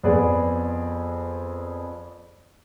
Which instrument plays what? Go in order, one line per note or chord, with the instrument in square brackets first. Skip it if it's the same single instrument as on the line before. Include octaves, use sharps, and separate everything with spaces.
[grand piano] F2 B3 G#4 D5